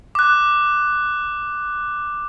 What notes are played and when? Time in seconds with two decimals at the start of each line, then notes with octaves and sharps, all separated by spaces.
0.15 D6 F#6